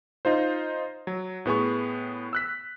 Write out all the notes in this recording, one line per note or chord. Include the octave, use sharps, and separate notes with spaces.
D#4 F4 C5
F#3
A2 B3 G#4 C#6
E6 F#6 B6